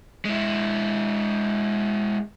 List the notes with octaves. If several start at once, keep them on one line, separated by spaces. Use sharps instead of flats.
G#3 E4